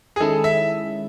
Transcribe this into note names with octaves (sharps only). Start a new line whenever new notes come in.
G#4
D#3 G#3 C#4 E4 A4
E5